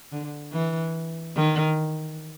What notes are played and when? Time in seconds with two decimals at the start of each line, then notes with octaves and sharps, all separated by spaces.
0.12 D3
0.53 E3
1.36 D#3